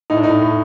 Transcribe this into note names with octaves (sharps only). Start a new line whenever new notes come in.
A2 D#4
D4
A2 D#4
A2